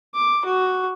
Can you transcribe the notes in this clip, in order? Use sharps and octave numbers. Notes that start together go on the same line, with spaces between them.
D6
F#4